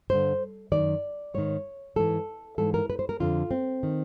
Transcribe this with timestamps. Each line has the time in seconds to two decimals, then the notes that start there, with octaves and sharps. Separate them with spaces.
0.10 G2 D3 C5
0.72 F#2 D#3 D5
1.34 G#2 D#3 C#5
1.96 G#2 E3 A4
2.58 G#2 E3 A4
2.74 A#4
2.90 B4
2.99 C5
3.09 A#4
3.20 F2 D3 F4
3.51 C4
3.83 D#3